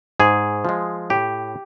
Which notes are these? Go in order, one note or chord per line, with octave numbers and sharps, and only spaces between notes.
G#2 G#4
F3 G#3
A2 G4